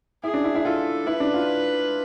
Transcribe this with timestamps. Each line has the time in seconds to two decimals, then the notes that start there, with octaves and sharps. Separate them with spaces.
0.23 E4 G#4
0.34 D4
0.44 E4
0.55 E4
0.65 F4 A4
1.07 E4 B4
1.20 D4
1.34 F4